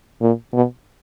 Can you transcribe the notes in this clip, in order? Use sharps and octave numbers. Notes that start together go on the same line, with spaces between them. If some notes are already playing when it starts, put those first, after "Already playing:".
A#2
B2